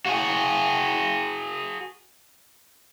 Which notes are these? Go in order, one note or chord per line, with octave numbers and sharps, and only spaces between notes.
F#4 G#4